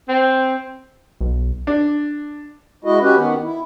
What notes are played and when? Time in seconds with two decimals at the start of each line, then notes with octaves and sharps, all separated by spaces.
0.08 C4
1.21 B1
1.67 D4
2.85 G#3 E4 F#4 D#5
3.02 C#4 F#4 G4 B4
3.16 D#3 B3
3.43 E4